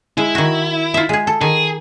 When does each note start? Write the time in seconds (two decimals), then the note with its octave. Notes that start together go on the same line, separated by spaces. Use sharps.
0.17 G#3 E4
0.35 D#3 F#4
0.94 F4 E5
1.09 G#3 G#4
1.27 A4
1.41 D#3 G#4